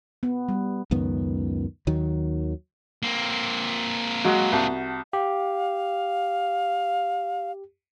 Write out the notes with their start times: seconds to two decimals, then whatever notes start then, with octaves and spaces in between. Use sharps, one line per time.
0.23 B3
0.49 G3
0.91 C#2 F#2 D#3 B3
1.87 D#2 D#3 F#3
3.03 A#3 C4
4.24 F#3 G#3 F#4
4.52 C2 F#4 A5
5.13 G4 F5